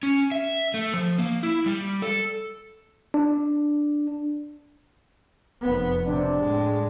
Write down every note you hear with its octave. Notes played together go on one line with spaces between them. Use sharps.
C#4
E5
A3
F3
A#3
E4
G3
A4
D4
F1 B3
C3 D4
A2 G#3